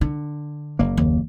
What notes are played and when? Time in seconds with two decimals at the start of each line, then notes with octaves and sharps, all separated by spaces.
0.01 D3
0.79 F#1 A#3
0.97 D#2